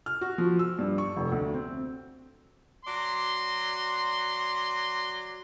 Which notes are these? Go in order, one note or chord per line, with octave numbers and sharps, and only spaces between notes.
F6
F#4
F3
E6
G2
C#6
F1
D2
C4
F#3 D5 C6